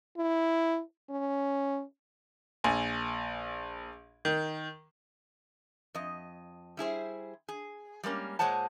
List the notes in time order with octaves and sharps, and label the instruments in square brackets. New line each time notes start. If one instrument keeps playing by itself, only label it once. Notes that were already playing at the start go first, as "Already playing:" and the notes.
[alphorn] E4
C#4
[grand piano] A#1 G#5
D#3
[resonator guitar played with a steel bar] F2 D#5
G3 E4 G#4 C5
G#4
G3 G#3 A#3 C#4
A#2 G#3 C5 C#5 F#5 A5